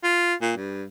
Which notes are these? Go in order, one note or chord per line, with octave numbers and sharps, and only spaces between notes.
F4
A#2
G2